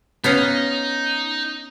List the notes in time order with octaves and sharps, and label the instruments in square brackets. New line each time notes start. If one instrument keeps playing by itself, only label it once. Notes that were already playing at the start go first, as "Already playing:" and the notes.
[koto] B3 C#4 F5 [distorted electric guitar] D#4